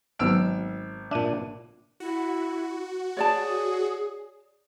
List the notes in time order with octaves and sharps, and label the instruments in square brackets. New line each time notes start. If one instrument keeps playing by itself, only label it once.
[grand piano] G#1 E6 D7 [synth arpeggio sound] F#3 B3 F6
[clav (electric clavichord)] A#2 D4 [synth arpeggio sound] E5 D#7
[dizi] E4 [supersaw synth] F#4
[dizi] G#4 [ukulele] C#5 D5 A5